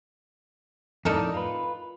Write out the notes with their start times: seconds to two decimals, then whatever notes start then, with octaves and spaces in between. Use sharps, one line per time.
1.05 F2 A2 D#4 A4 A#4 D5
1.34 F4 B4